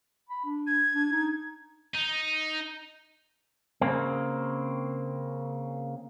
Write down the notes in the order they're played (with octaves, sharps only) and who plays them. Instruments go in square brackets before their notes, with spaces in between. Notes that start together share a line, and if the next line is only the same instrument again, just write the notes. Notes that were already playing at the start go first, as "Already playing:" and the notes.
[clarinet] B5
D4
[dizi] G#6
[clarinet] D4
D#4
[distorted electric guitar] D#4
[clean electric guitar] C#3 A#3 C4